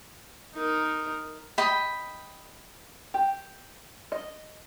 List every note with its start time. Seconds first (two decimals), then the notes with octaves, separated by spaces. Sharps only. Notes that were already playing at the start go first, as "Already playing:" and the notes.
0.54 D#4 A#4
1.58 D#5 G5 B5
3.14 G4
4.12 D#5